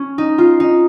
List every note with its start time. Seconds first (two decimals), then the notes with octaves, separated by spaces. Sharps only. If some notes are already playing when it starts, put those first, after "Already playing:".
Already playing: C#4
0.18 D#4
0.38 F4
0.60 D#4